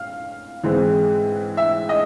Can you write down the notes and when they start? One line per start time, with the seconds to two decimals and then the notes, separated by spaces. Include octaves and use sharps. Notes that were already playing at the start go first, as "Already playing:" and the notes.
Already playing: F5
0.63 G#2 E3 G#3 C4
1.57 E5
1.89 D#5